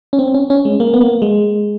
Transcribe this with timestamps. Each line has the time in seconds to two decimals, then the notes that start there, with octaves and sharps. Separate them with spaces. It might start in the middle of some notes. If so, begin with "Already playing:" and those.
0.13 C#4
0.19 C4
0.34 C#4
0.50 C#4
0.65 G#3
0.80 A#3
0.94 B3
1.01 A#3
1.22 G#3